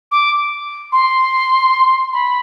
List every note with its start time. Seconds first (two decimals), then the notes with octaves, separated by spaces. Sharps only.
0.11 D6
0.92 C6
2.13 B5